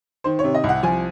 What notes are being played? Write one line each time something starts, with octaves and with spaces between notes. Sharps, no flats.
D#3 C5
C#5
C3
D#5
C2
F#5
F3 G#5